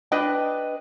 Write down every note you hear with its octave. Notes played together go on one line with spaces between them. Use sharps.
D4 B4 D#5 G5